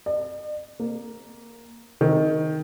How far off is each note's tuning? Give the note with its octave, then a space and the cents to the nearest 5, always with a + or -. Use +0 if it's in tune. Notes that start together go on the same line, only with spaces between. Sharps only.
D5 +45
A#3 +5
D#3 +10